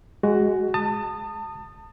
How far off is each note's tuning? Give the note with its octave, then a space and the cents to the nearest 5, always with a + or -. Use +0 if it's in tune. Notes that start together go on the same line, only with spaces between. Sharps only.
G#3 +0 F#4 +15
A5 +30 D#6 -15